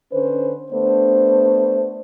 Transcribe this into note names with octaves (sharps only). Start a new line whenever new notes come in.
D3 C#4 B4 C5
A3 B3 D4 C5